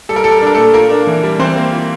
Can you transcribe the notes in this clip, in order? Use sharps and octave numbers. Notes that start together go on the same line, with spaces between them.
G3 A4
A#4
G3 A4
A#4
A4
D4
A#4
A#2 A3 A4
A#3 F4 A#4
D4
E3
G3
E3 C4 C5
A#3
F4